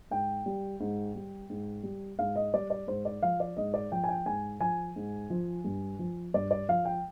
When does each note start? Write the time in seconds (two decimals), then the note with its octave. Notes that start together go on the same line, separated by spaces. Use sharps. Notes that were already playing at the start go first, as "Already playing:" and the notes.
0.11 G#2 G5
0.46 G3
0.80 G#2
1.15 G3
1.50 G#2
1.83 G3
2.19 G#2 F5
2.36 D#5
2.54 G3 D5
2.70 D5
2.87 G#2 C5
3.05 D5
3.23 F3 F5
3.40 D5
3.57 G#2 D#5
3.74 D5
3.92 F3 G5
4.04 G#5
4.09 G5
4.26 G#2 G#5
4.60 F3 G#5
4.96 G#2
5.30 F3
5.64 G2
5.99 F3
6.34 G2 D5
6.51 D5
6.69 F3 F5
6.85 G5